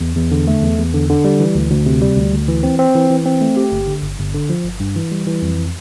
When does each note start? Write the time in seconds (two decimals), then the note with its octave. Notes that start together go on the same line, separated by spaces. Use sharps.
0.01 E2
0.16 E2
0.31 D3
0.47 A3
0.63 E2
0.78 E2
0.94 D3
1.09 D3
1.25 G3
1.40 E3
1.55 D2
1.71 D2
1.86 C3
2.02 G3
2.17 D2
2.32 D2
2.48 E3
2.63 C4
2.79 C4
2.95 E3
3.10 E3
3.26 C4
3.41 A3
3.57 G4
3.72 G1
3.87 D3
4.03 G1
4.18 G1
4.34 D3
4.49 F3
4.65 G1
4.80 G2
4.96 E3
5.12 G3
5.26 E3
5.42 F2